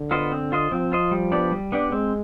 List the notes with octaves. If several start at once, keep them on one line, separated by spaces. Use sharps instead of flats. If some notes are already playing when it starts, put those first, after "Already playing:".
Already playing: D3
B3 F4 C5 D#5
C4
F4 C5 D#5
F3 C4
F4 C5 D#5
G3
B3 D4 G4 D5
G3
B3 D4 G4 D5
G#3 C4